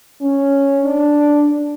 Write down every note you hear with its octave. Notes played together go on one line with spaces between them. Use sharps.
C#4
D4